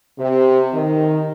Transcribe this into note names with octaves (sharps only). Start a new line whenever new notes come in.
C3
D#3